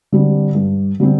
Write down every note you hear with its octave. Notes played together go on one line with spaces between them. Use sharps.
D3 G3 C4
G2
D3 G3 C4